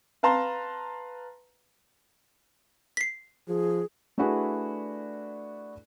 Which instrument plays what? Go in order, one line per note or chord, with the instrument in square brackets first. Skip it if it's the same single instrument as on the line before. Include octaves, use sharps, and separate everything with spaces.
[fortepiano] B4 F5 A5 A#5 C6
[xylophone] B6 C7
[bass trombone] F3 [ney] G#4
[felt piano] A3 D4 E4 F#4 G#4 B4